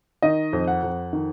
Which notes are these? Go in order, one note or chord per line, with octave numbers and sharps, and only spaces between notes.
D#3 D#5
F2
F#5
F2
D#3